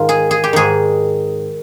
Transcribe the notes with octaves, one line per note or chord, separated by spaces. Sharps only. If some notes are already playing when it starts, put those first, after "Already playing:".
Already playing: G#2 D#3 F4
G#4
G#4
G4
G#2 D#3 G#4